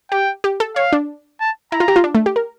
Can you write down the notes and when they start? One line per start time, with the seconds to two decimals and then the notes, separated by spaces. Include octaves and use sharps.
0.12 G4 G5
0.44 G4
0.60 A4
0.76 C#5 F5
0.93 D4
1.40 A5
1.72 E4 A#5
1.80 F4
1.88 G4
1.96 F4
2.04 D4
2.15 A3
2.26 G4
2.36 A#4